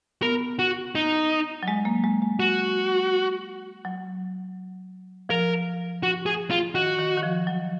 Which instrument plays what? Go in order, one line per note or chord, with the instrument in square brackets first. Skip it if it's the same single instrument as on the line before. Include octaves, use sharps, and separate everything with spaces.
[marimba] B3 [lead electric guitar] A#4
[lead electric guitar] F#4
D#4
[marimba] F#3
G#3
A#3
G#3
G#3
[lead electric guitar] F#4
[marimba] F#3
[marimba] F3 [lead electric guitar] A#4
[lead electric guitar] F#4
G#4
F4
[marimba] D#3 [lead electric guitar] F#4
[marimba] D#3
D#3
F3
F#3